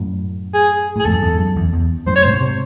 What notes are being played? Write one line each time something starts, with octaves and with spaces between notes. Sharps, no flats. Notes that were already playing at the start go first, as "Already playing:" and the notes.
Already playing: F#2 A2
G#4
A2 G#4
E2 G#2 A4
F#2
E2
F#2
E2
E2
F#2 A2 C5
C#5
G#2 C3 C5
C3